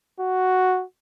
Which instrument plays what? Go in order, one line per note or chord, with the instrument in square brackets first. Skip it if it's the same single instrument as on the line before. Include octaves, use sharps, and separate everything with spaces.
[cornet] F#4